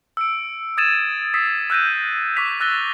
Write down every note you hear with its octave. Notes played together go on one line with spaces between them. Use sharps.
E6 C#7 D7
D#6 G#6 A6 D#7 E7
D#6 E6 B6 C7
E6 F#6 G6 A#6 D#7
C#6 D6 G6 B6 F7
E6 F#6 A6 A#6 G7